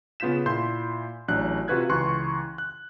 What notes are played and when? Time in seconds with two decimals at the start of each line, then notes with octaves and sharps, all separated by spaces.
0.20 C#3 B3 F4 G6 B6 E7
0.46 A#2 E4 C6 G6
1.28 A1 F#3 D4 F#6
1.68 C3 F4 F#4 B4 F#6 G#6
1.89 C#2 E3 C6 C#6 F#6
2.58 F#6